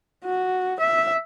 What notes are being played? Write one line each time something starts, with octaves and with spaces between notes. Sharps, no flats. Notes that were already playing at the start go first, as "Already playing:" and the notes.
F#4
E5